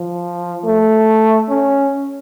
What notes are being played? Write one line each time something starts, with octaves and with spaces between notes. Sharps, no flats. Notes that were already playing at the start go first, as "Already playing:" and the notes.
Already playing: F3
A3
C#4